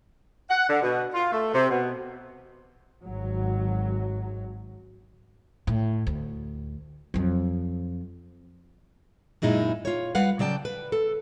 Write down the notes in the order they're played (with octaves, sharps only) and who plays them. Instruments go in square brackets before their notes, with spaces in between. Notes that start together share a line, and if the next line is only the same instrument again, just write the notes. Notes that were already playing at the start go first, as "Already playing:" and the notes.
[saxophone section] F#5
D3
B2
F4
A3
C3
B2
[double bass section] G#1 F#3
[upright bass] A2
D2
F2 F#3
[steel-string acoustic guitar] F#2 A#2 G#3 D#4 E4
F4 C#5
G3 B4 F5 F#5
C#3 F#3 D5 G5 A5
B4
A4